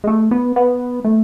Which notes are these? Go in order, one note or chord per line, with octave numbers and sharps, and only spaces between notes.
G#3
A3
B3
B3
A3